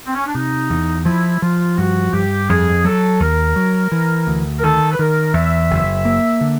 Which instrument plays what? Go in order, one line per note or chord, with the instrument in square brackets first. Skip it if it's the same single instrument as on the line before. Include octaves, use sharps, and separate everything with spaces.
[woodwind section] C4
C#4
D4
[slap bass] C3 [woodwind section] D#4
[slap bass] E2
[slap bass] F3 [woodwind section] E4
[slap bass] F3 [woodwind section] F4
[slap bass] G2 [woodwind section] F#4
[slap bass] G2 [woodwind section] G4
[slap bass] F2 [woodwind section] G#4
[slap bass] F#3 [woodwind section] A4
[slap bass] D#2 [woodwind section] A#4
[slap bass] F#3
E3
D2
[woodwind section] A#4
[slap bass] D#3 [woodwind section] A4
[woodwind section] B4
[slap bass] D#3 [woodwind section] A#4
[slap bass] E2 [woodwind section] E5
[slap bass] F#1
A#3
D3